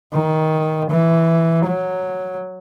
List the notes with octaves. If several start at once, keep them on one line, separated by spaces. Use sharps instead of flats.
D#3
E3
F#3